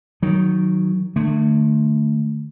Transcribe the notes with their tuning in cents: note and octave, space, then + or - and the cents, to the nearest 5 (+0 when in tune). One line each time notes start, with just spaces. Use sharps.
D#3 +0 F#3 +0
D3 +35 A3 +5